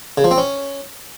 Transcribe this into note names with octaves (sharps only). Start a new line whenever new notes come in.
C#3
F3
C4
C#4